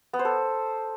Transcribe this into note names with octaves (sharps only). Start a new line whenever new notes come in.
B3
C5
A4